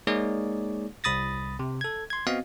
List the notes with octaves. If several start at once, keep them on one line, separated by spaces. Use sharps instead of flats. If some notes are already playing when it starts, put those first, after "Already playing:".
G#3 A#3 D#4 G#4 C#5 D5
C2 B5 D#6 A6 A#6
C3
A4 G#6
C6 G#6
B3 C4 F#4 D#5 F5